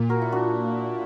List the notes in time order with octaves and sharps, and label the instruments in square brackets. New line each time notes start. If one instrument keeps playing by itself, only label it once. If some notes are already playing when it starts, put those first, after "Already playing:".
Already playing: [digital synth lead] A#2
[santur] F#4 A#4
E4
D4 F#4